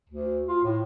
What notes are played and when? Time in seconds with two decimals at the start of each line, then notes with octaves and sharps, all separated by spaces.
0.09 D2
0.47 F4
0.63 A2